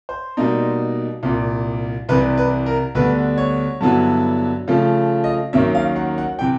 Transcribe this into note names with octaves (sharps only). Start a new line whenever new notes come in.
C5
B2 G3 A#3 D#4
C2 A#2 G3
C2 C3 E3 G3 B4
B4
A#4
D2 D3 G3 B3 B4
C#5
G2 D3 F#3 B3 E4
C#3 F3 A3
D#5
D#2 D#3 F#3 A#3 C#4 E5
F5
F#5
F#5
C3 E3 G5